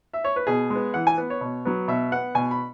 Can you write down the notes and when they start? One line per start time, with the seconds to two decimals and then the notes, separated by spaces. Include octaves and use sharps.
0.13 E5
0.24 C#5
0.36 B4
0.47 B2 G#4
0.70 G#3
0.76 B3
0.94 E3 F#5
1.07 G#5
1.18 B3
1.30 C#5
1.41 B2
1.65 F#3 B3
1.88 B2 E5
2.12 B3 F#5
2.35 B2 G#5
2.51 B5